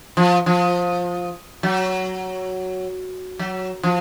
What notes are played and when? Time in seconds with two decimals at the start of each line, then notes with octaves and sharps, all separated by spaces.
0.17 F3
0.46 F3
1.63 F#3
3.39 F#3
3.83 F3